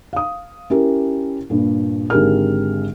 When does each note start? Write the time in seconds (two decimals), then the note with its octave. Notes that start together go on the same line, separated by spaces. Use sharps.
0.13 F5 D#6
0.70 C#4 E4 G4 A#4
1.50 G2 A#2
2.10 G#1 D3 G4 G#4 A#4 F6